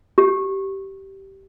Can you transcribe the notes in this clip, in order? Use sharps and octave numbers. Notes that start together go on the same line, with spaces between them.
G4